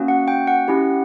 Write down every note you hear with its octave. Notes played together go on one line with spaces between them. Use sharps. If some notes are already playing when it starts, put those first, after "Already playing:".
Already playing: A#3 C#4 F#4
F#5
G5
F#5
C#4 E4 G4